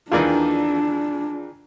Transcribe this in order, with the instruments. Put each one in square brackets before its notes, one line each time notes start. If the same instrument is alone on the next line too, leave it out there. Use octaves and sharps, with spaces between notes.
[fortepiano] D#2 D#3 E3 [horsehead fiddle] D4 [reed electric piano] F4 G#4 D5